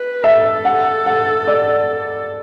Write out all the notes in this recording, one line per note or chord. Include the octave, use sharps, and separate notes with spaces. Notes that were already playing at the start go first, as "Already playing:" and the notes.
Already playing: B4
A4 E5
F#5
F#5
D5